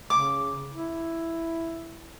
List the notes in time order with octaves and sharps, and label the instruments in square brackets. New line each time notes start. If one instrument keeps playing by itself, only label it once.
[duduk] C#3 [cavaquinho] D6
[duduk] E4